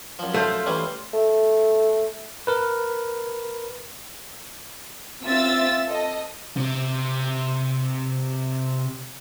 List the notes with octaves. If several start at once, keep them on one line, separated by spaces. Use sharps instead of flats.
F#2 F3
A3 F4 C5 F5
E3 G3 C#4 F5 B5
A3
A#4 B4
C4 F4 E5 E6 A6
A4 D#5
C3 C4